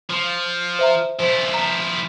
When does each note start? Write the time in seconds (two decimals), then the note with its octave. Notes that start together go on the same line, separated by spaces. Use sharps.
0.10 F3
0.79 C5 E5 A#5
1.20 F3 E4 C5
1.54 A#5